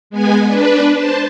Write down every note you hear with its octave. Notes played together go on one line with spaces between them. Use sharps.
G#3 B3 G#5
D4 B4
C5 A5